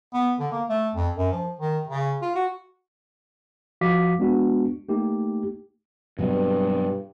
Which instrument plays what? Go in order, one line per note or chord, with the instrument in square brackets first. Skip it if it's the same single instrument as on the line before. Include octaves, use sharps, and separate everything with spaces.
[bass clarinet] B3
D3
A#3
A3
F2
F#2
F3
D#3
C#3
F4
F#4
[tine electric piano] F3 F#4 F5 D6 B6
G#3 B3 D4 F#4
A3 A#3 D#4 G4
[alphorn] G2 [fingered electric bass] B2 F#3 C4